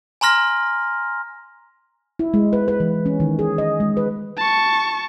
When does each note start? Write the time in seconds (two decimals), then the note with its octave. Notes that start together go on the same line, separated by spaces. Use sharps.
0.21 G#5 A#5 C6 F6 A#6
2.19 E4
2.34 G#3
2.53 B4
2.68 B4
2.80 E3
3.06 C#4
3.20 D#3
3.39 G#4
3.58 D#5
3.80 G#3
3.97 B4
4.38 A5 C#6